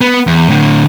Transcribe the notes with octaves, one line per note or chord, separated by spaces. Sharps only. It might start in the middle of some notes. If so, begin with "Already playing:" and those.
B3
E2
A2 D3